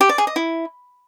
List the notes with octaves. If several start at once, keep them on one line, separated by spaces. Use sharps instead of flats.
G4
D5
G#4
D#5
E4